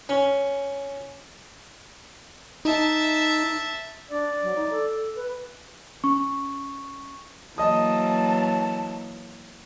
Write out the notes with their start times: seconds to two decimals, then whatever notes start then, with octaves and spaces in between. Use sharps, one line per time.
0.09 C#4
2.65 D#4 E5 A5
4.10 D4 D5
4.42 F#3
4.55 D#4
4.70 A4
5.15 B4
6.04 C#4 C#6
7.58 E3 F#3 A#3 D#5 A5 D#6